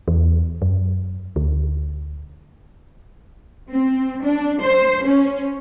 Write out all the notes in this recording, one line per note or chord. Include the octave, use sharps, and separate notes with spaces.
E2
F#2
D2
C4
D4
C5
C#4